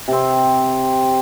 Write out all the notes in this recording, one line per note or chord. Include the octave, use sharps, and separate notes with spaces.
C3 C4